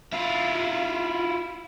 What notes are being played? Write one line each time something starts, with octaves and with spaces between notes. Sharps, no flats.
E4 F4